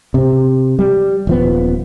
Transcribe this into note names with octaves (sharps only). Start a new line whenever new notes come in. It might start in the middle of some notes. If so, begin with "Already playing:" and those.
C3 C4
G3
D#1 F3 B3